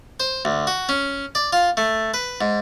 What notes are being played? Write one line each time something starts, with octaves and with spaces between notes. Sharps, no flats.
C5
D2
F#4
C#4
D5
F4
A3
B4
G#2